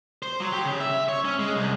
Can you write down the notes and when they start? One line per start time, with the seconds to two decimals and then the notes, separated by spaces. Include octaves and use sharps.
0.23 C5
0.40 F#3
0.52 G4
0.65 C#3
0.80 E5
1.09 C#5
1.25 C#4
1.39 G#3
1.56 C2